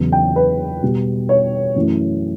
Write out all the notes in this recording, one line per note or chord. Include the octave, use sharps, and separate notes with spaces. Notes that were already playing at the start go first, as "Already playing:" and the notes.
Already playing: E2 C#3 F#3
G5
B4
B2 G3
C#5
F#2 E3 A3